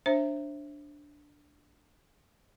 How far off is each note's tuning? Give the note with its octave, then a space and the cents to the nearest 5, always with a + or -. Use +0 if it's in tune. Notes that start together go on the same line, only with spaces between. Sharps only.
D4 +0 C5 +30 E5 +5